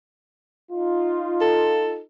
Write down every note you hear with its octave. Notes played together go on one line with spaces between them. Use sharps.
D#4 F4
A4